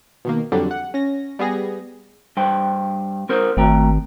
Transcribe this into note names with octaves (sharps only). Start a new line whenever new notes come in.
B2 D#3 A#3
F2 D3 F#3 G3 D4
F#5
C#4 A#6
G3 B3 G#4 A#6
G2 C5 G5
C4 A#4 C5
G#1 A3 G5 A#5